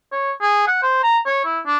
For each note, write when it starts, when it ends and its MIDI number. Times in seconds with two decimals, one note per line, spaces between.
0.12 0.31 73
0.41 0.66 68
0.67 0.80 78
0.83 1.02 72
1.03 1.18 82
1.26 1.41 73
1.45 1.60 64
1.66 1.78 62